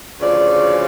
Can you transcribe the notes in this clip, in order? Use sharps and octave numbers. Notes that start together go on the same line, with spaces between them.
D2 C#3 F3 D5